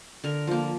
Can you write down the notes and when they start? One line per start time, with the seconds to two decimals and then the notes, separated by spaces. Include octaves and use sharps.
0.24 D3 A#4
0.47 F3 A#3